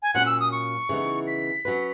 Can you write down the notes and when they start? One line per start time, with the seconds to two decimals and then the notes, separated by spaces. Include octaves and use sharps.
0.02 G#5
0.14 A#2 F#3 C#4 F#5
0.26 E6
0.40 D#6
0.52 C#6
0.89 C#3 E3 B3 D#4
1.27 B6
1.65 F#3 C#4 F#4 B4